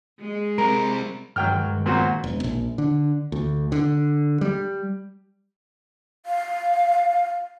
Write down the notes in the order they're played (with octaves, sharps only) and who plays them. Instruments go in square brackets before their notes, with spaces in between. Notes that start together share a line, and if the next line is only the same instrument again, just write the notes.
[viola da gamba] G#3
[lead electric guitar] G3 C4 [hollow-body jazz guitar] A#4
[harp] D#1 C#2 D#3 [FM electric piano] G2 [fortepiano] F#3 G5 F6
[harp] F2 B3 [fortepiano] A#2 C4 F#4
[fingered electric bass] E1
A#1
D3
D2
D3
G3
[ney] F5